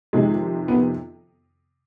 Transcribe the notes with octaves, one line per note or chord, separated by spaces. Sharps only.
F2 C3 D#3 G#3
B3